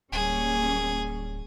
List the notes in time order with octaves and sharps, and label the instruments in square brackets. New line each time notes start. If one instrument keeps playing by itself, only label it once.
[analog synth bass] D1 [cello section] G3 A#3 C#4 [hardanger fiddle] G#4